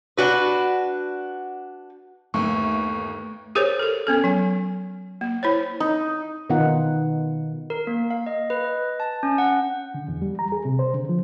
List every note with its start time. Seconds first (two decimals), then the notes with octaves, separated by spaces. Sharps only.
0.17 D4 F#4 B4
2.34 G1 D#2 A3 C#6
3.55 G4 G#4 A#4 C5 C#5
3.79 A4 A#4
4.07 B3 C#4 A4
4.24 F#3 G#5
5.21 A#3
5.43 E4 C5 C#5
5.80 D#4
6.50 B2 D#3 B3 D#4 F4 F#5
7.70 A#4
7.87 A#3
8.10 F5
8.27 D#5
8.50 B4
8.64 D#5
9.00 A5
9.23 C#4
9.38 F#5
9.94 D3
10.08 E2
10.22 G3
10.39 A#5
10.52 G#4
10.65 C3
10.79 C5
10.94 D3
11.09 F3